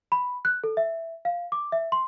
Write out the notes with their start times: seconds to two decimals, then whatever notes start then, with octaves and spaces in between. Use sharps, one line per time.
0.12 B5
0.45 F#6
0.64 A4
0.77 E5
1.25 F5
1.52 D6
1.72 E5
1.92 C6